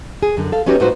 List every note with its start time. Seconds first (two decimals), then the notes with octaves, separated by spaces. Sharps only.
0.23 G#4
0.37 F#2 D3
0.52 A4 F5
0.66 B3 C#4 D#4 F#4 G4 C#5
0.80 A2 D#4 F4 F#4 B4 C5